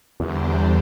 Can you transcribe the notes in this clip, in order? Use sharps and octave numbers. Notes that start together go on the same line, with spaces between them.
E2 D3 G3 D4 G4 C5